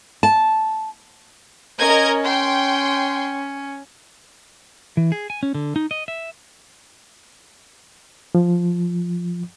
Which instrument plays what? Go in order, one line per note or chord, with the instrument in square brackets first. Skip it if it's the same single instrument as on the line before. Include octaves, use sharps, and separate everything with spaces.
[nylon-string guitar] A5
[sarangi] C#4 [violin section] A#4 D#5 G#6
[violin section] G5 C6
[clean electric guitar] E3
G#4
G#5
C#4
D3
D#4
D#5
E5
[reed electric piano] F3